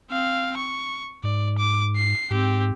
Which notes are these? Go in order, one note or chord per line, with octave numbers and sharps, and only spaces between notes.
C4 F5
C#6
G#2 D5
D6
C7
G#2 C4 G4